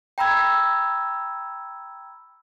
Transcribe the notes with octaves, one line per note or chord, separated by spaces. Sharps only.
G5 A#5 B5 E6 G#6